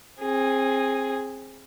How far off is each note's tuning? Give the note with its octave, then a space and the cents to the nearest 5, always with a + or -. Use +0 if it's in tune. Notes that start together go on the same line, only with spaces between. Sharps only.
C4 +25 G#4 +0